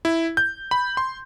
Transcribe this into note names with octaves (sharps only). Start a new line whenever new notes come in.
E4
G6
B5
C6